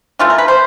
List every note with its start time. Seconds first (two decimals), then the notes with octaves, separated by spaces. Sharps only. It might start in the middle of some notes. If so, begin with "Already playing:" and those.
0.19 E3 A3 F4
0.30 A#4
0.38 B4
0.48 C5